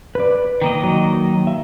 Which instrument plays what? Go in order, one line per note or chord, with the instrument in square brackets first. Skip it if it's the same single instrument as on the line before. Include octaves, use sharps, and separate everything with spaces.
[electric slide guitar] B4 D5
[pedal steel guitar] D#3 A#3 D#5
[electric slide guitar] F#3
E5